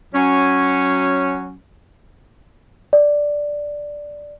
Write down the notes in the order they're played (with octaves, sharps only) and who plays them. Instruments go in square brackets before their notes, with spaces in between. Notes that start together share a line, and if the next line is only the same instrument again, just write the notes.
[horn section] F#3 C#4
[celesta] D5